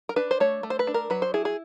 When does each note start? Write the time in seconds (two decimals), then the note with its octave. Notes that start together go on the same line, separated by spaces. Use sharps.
0.09 A#4
0.16 D4 B4
0.31 C5
0.40 A3 C#5
0.63 A3
0.70 C5
0.79 B4
0.87 D4
0.94 A#4
1.10 F#3 B4
1.22 C5
1.34 E4 G#4
1.45 G#4